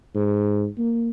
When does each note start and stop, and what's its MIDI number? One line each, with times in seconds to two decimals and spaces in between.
0.15 0.67 44
0.78 1.10 58